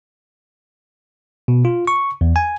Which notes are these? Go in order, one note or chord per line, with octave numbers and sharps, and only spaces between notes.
B2
F4
C#6
E2
G#5